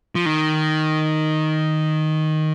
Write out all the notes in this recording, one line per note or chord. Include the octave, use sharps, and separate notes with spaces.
F3
D#3